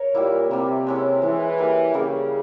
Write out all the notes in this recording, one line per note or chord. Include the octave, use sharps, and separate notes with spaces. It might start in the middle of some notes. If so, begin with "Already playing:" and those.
Already playing: A#4 C#5
A#2 G3 A#3 E4
C3 G3 A#3 E4
G#3 C#4 E4
E3 G#3 C#4 E4
G3 A#3 E4 A#4
C#3 G3 A#3 E4 A#4